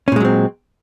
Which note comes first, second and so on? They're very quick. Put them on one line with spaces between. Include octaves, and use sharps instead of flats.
C#4 A#2 G#3 F#3 C4